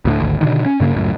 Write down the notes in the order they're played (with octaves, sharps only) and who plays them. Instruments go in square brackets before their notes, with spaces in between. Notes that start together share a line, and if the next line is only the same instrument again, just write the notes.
[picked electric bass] D2 A2 D3
G#1 D2
B2 D3 D#3
C#4
G2 C#3 A#3
C#2 F#2 A2